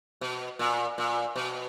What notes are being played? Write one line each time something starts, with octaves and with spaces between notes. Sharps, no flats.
B2
A#2
A#2
B2